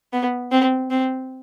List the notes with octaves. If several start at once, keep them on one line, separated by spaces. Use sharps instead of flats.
B3
C4
C4